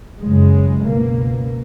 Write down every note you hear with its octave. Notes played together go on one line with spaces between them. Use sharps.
F#1 F#2 C#3 G#3
C#2 B2 A#3